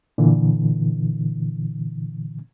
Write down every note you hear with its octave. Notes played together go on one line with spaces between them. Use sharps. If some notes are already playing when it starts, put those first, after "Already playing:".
A#2 D3 E3